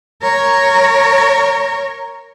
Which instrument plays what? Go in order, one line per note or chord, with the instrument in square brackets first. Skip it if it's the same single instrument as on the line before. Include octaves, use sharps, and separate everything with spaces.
[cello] A#4 C#5